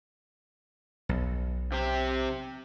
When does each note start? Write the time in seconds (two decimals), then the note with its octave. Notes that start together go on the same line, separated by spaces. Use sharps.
1.09 B1
1.72 C3 G4